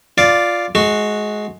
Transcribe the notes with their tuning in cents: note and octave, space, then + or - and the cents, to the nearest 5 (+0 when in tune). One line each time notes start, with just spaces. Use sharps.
F4 +0 D5 +0
G#3 +20 F#4 -5